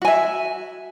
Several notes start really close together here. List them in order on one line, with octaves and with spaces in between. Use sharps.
F#4 G#5 E5